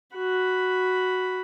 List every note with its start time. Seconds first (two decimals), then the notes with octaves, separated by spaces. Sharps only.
0.15 F#4 B5